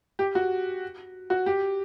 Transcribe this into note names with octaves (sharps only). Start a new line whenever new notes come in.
G4
F#4
F#4
G4